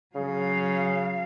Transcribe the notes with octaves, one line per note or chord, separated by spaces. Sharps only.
C#3 F#3 F5